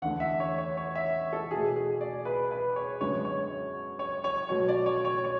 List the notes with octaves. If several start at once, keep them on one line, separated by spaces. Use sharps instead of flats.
E2 D3 A3 F#5
E5
C#5
C#5
C#5
E5
A4
B2 A3 G#4
G#4
D5
B4
B4
C#5
F#2 D3 G#3 B3 C#5
C#5
C#5
C#5
B2 F#3 A3 C#5
D5
C#5
C#5
C#5